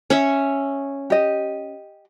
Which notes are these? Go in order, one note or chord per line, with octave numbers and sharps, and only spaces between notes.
C#4 C#5 E5
G4 D#5